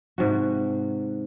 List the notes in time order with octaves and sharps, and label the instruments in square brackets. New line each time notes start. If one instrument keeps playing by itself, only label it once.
[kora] G#2 C3 F#4